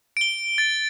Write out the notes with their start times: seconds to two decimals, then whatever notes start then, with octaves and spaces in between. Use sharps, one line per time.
0.17 D7 G7
0.58 A6